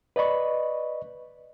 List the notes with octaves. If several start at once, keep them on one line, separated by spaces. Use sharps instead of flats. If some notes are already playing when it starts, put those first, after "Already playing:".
B4 D5 D#5 B5 C#6